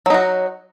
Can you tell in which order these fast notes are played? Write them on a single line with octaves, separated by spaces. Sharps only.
F#3 D#4 F#4